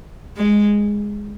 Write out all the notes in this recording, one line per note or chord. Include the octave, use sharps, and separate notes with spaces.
G#3